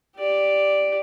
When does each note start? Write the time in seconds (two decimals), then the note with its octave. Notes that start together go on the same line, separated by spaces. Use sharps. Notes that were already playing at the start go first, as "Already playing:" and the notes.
0.17 G4 D5